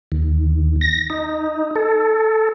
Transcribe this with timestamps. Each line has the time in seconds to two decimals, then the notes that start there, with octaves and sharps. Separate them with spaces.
0.12 D#2
0.81 A#6
1.10 D#4
1.76 A4